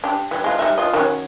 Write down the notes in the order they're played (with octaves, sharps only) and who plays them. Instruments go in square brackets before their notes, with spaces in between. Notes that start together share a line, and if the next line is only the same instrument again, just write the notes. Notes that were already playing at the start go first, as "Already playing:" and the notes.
[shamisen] D4 G4
E3 G3
G#3 F4
G3 D#4 E5
F4 D#5
D#3 F#3 C#4